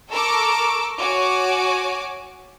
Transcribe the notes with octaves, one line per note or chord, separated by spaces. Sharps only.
A4 A#4 C#6 D6 E6
F#4 C#5 G#5 D6